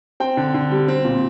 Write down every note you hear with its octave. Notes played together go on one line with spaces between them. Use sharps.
C4 G5
D3
D3
G3
C4
A#2